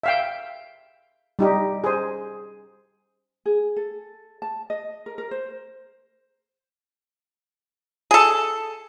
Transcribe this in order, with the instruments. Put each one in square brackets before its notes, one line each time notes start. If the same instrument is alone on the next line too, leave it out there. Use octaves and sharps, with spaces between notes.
[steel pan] E5 F5 G5
G3 D#4 G4
G#4 C5
[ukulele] G#4
A4
A5
D#5
A#4
A#4
C5
[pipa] G#4 A4